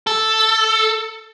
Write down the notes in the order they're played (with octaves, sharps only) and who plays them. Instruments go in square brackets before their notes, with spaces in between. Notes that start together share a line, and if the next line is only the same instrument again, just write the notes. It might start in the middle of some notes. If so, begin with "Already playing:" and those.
[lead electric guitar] A4